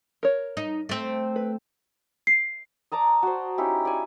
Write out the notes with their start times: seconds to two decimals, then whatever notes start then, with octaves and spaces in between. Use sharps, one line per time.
0.23 A#4 C#5
0.57 D#4
0.89 A3 C4
1.36 B4
2.27 C7
2.92 D5 A5 A#5 D#6
3.23 F#4 C5
3.58 C#4 D#4 E4 G4
3.85 D5 G#5